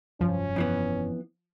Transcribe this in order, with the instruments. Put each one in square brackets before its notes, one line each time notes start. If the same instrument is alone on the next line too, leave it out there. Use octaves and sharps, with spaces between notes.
[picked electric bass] F1 G2 F#3 [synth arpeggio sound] F3 [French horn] C#4
[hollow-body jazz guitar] F2 E3 B3